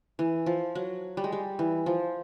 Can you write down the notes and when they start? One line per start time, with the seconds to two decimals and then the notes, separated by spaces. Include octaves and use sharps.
0.19 E3
0.46 F3
0.75 F#3
1.17 G3
1.24 G#3
1.32 G3
1.59 E3
1.86 F3